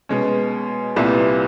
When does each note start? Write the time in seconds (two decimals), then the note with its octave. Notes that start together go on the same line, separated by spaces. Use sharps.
0.09 B2 G#3 C#4
0.96 C2 A#2 G3 B3 E4